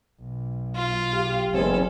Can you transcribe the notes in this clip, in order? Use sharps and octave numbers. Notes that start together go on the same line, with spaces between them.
B1
F4
G4
F#1 E2 G#3 C4 C#4 A4